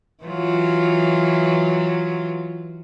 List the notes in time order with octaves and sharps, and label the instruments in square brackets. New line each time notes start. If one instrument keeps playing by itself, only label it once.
[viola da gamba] E3 F#3 F4